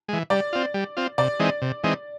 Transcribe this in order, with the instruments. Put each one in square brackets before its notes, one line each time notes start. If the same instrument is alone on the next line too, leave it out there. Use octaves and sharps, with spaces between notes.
[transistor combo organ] E3 G#3
[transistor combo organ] G3 [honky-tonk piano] D5
[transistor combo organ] C4 F4
G3
C4 F4
[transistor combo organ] C3 [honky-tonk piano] D5
[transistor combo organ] E3 G#3 C4 D#4
C3
E3 G#3 C4 D#4